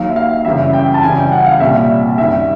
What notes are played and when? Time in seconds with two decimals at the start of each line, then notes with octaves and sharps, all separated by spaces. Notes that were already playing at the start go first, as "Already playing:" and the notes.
Already playing: D#2 D#3 F#3 F5
0.09 E5
0.16 F5
0.45 F#2 C#3 E3 G3 E5
0.73 G5
0.94 A5
1.03 F#2 C#3 E3 G3 G#5
1.17 G5
1.32 F#5
1.46 F5
1.60 C2 A#2 G3 E5
2.18 F#2 D#3 G3 E5